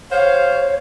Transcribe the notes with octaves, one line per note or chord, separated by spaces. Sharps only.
G4 C5 C#5 F5